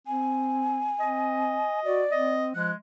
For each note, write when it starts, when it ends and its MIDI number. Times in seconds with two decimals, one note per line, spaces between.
0.07 0.93 60
0.07 1.80 80
1.00 1.66 60
1.00 2.05 75
1.85 2.04 66
1.85 2.34 74
2.11 2.53 60
2.11 2.48 75
2.55 2.72 53
2.55 2.75 56
2.55 2.70 90